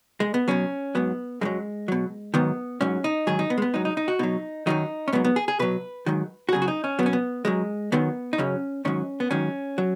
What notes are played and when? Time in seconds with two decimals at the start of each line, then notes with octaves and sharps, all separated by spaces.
0.20 G#3
0.34 B3
0.48 B2 F#3 C#4
0.95 G#2 F#3 B3
1.41 F#2 D#3 F#3 G#3
1.88 B2 F#3
2.34 G#2 D#3 F#3 B3
2.81 G#2 F#3 C#4
3.04 D#4
3.27 G#2 D#3 F#3 G#4
3.39 D#4
3.50 B3
3.58 G#3
3.62 B3
3.74 G#2 F#3 D#4
3.85 D#4
3.97 D#4
4.08 F#4
4.19 B2 F#3 D#4
4.67 F#2 D#3 F#3 D#4
5.08 C#4
5.13 G#2 F#3 B3
5.25 B3
5.36 G#4
5.48 G#4
5.59 B2 F#3 B4
6.06 G#2 D#3 F#3
6.49 F#4
6.52 F#2 C#3 F#3 G#4
6.62 F#4
6.68 D#4
6.84 C#4
6.99 F#3 B3
7.03 B2 C#4
7.13 B3
7.45 F#2 F#3 G#3
7.92 F#2 D#3 F#3 B3
8.33 D#4
8.38 F#2 C#3 F#3 C#4
8.85 G#2 D#3 F#3 C#4
9.20 B3
9.31 G#2 D#3 F#3 C#4
9.78 F#3